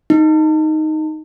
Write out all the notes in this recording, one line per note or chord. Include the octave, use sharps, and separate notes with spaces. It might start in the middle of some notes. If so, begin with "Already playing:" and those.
D#4